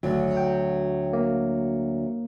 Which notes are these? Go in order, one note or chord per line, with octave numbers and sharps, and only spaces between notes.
G#1 D2 F#3
G5
A#3